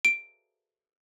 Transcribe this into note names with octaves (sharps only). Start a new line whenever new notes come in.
D7